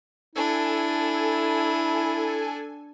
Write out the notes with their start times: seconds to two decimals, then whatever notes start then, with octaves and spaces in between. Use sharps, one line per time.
0.35 D4 E4 A4 G#5